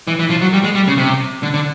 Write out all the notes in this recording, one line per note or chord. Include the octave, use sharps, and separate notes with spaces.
E3
E3
F3
F#3
G3
G#3
G3
C#3
C3
D3
D3